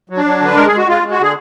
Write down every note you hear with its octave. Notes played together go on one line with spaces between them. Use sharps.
F#3
D4
F#3
D3 B4
G#3 A#4
G#4
G#3
F#4
G#3 F4
G#3
F#4
D3 G#4